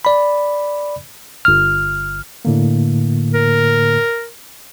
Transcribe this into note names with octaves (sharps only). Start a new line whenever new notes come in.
D5 B5
G1 F6
A2 D3 A#3
A#4